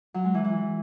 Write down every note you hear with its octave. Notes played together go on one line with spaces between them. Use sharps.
F#3
G#3
E3
E3